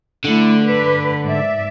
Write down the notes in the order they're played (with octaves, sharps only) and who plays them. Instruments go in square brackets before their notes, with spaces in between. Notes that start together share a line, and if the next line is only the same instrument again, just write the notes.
[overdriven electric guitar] D3 [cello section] A3 E4
[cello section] B4
G#2 D5 E5